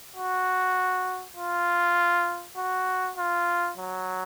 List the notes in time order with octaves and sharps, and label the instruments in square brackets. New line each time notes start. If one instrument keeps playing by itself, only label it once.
[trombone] F#4
F4
F#4
F4
F#3